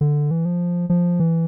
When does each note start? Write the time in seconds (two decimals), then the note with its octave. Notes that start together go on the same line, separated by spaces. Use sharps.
0.01 D3
0.31 E3
0.45 F3
0.90 F3
1.20 E3